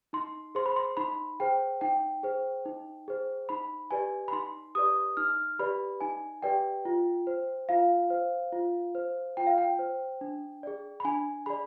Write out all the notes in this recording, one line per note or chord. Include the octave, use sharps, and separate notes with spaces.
D#4 C6
G#4 C5 C6
B5
C6
D#4 B5
G#4 C5 G5
D#4 G5
G#4 C5
D#4
G#4 C5
D#4 B5
G4 B4 D5 G#5
B5
D#4 C6
G4 B4 D5 D#6
D#4 F6
G4 B4 D5 B5
D#4 G#5
G4 B4 D5 G5
F4
C5
F4 F5
C5
F4
C5
F4 G5
F5
G5
C5
D4
G#4 D5
B5
D4 G#5
G#4 D5 B5